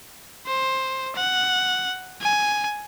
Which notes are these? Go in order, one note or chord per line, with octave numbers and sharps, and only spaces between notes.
C5
F#5
G#5